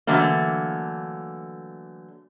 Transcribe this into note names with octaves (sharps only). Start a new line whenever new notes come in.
D3 E3 F#3 A3 A#3